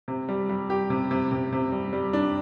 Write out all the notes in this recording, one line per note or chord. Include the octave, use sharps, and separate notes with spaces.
C3
G3
G3
G4
C3
C3
C3
C3
G3
G3
D4